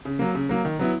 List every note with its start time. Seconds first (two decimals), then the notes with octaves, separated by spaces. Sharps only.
0.05 C#3
0.19 F#3 A#3
0.35 C#3
0.49 F#3 A#3
0.65 D#3
0.79 F#3 B3 E4